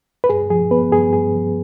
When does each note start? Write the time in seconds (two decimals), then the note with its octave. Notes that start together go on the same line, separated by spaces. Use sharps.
0.24 B4
0.29 G2 G#4
0.50 F3 G#4
0.71 B3 B4
0.92 G2 G#4
1.13 G2 G#4
1.35 F3